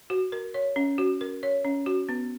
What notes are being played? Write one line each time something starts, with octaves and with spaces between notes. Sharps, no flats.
F#4
A#4
C#5
C#4
F#4
A#4
C#5
C#4
F#4
B3